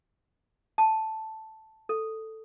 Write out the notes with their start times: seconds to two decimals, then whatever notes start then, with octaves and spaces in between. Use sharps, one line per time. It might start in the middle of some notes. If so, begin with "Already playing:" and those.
0.78 A5
1.89 A4